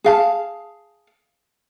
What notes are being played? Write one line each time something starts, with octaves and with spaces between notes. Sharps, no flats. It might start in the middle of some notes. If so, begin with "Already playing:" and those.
G#4 F5 A5